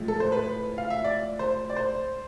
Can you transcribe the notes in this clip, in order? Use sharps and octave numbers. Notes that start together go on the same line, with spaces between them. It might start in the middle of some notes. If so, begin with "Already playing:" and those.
Already playing: A2 F3 G#3
A4
C5
B4
F5
E5
D5
C5
D5
C5